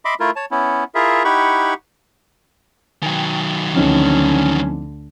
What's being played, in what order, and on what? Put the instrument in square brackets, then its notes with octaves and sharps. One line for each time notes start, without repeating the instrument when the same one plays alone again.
[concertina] D#5 E5 B5 C6 D6
A3 E4 F4 A#4
C#5 A5
B3 C#4 E4
E4 F4 G#4 A#4 E5
D#4 E4 G4 F#5 B5 C#6
[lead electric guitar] D#3 F#3 [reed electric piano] G5 G#5
[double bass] D2 D3 [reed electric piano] F3 C4 D#4 [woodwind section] C#4